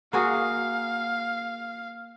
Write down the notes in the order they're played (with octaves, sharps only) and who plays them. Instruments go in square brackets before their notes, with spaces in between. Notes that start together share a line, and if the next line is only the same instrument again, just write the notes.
[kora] A#3 F#4 G#4 [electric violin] F5